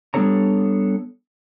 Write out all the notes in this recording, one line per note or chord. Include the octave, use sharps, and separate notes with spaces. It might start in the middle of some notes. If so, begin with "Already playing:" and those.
G3 B3 D4 A4 C#5 A#5